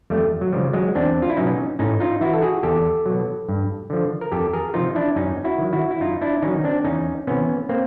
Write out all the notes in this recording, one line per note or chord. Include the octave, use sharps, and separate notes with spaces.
F2 G3 A3
F#3
C#3 F3 G3
F#3 G#3
E2 C4 D4
F4
E4
B2 F#3 C#4 D#4
A2 C#4 D#4
D#4 F4
E3 E4 F#4
A4
F#4 G#4
E2 G4 A4
B2 F#3
G2
D3 F3
A#4
F2 G4 A4
G#4 A#4
C3 F3 D#4 F4
D4 E4
F#2 C#4 D#4
E4 F#4
D#3 F#3
E4 F#4
E4
F#2 D#4 F4
D4 E4
D#3 F#3 C#4 D#4
D#4
C4 D4
E2 C#4 D#4
C3 E3 B3 C#4
A#3 C4